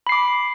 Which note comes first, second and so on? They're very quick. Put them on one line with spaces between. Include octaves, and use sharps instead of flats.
B5 C7 D6